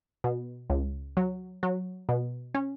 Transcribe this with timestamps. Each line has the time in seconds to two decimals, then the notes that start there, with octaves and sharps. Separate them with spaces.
0.24 B2
0.70 C#2
1.17 F#3
1.63 F#3
2.09 B2
2.54 C#4